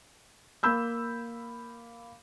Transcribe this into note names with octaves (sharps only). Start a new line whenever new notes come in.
A#3 B5 E6 G6